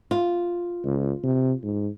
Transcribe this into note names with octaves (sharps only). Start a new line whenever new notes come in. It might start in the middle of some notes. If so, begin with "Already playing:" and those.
F4
C#2
C3
G#2